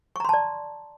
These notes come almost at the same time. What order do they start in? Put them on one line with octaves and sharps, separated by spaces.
C#6 A#5 C6 A5 D5